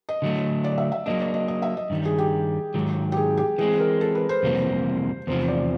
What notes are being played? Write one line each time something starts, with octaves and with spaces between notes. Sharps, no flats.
D#5
D3 F#3 A3
D5
E5
E5
F#3 A#3 D4 D#5
D5
D#5
D#5
E5
D#5
G2 D#3 G3
G#4
G4
G#2 D#3 F#3
G4
G#4
G4
E3 G#3 C4 G#4
A#4
A4
B4
C5
F2 C3 E3 G3 A#3
E2 C3 F3 C5
D5